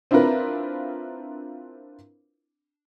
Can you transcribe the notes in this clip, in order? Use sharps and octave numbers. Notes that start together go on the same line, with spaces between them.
C4 D4 E4 F4 A#4 B4